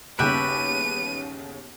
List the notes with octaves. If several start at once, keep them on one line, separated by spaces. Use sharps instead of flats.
G1 D#2 C#3 F#4 G4 B4 E5 D#7